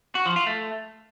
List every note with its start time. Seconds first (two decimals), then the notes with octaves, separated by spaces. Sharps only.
0.15 F#4
0.26 F3
0.36 F4
0.47 A3